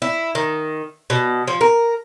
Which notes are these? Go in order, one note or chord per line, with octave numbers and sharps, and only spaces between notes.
E4
D#3
B2
F3
A#4